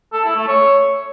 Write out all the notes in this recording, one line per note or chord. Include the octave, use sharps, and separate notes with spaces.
A4
E4
A3
C#5